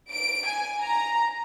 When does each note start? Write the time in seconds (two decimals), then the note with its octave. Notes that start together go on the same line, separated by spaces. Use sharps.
0.12 D7
0.46 G#5
0.81 A#5